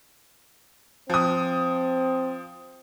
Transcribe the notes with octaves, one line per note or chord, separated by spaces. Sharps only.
F3 C4 D#6